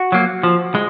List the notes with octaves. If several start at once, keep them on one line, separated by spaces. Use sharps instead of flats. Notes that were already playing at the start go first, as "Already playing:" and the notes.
Already playing: F#4
F#3 A#3
F3
G#3